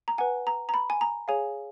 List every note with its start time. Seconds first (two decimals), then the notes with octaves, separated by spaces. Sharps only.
0.08 A#5
0.18 B4 F#5 G#5
0.47 A#5
0.69 A#5
0.74 B5
0.90 G#5
1.01 A#5
1.28 G#4 C#5 F5 G#5